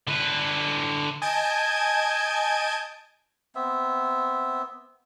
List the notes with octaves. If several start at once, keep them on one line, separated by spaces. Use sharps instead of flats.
D3 B4
D#5 G#5 A5 G6 G#6 D7
B3 C4 E5